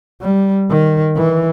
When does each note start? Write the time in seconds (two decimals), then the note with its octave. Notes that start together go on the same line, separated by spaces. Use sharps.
0.21 G3
0.70 D#3
1.16 E3